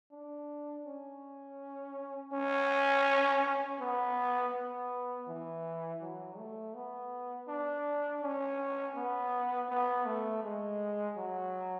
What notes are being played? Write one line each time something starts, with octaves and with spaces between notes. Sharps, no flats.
D4
C#4
C#4
B3
B3
E3
F#3
A3
B3
D4
C#4
B3
B3
A3
G#3
F#3